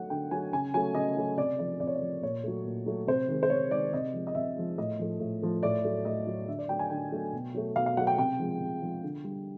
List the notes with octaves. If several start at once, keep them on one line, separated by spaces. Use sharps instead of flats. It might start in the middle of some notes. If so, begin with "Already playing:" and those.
Already playing: F#3 A3 F#5
D3 G5
F#3 A3 G#5
C#3 G#5
F#3 A3 G#5
C#3 D#5
F#3 A3
C3 D5
F3 A3 D5
C3 D5
C#5
D5
F3 A3
A#2 C#5
F#3 A3
A#2
F#3 A3
C3 C5
D#3 G#3
C5
C3 C#5
D#3 G#3 D5
C3 D#5
F3 G#3
D#5
C3 E5
F3 G#3
A2 D#5
F3 A3
A2
F3 A3
A2 D5
F#3 A3
A2 D#5
F#3 A3
D3 E5
D5
F#3 A3 G5
G#5
D3 G5
F#3 A3
B2
F#3 A3
B2 F5
F5
F#3 A3 F#5
G5
C3 G5
F3 G#3
C3
F3 G#3
D3
G3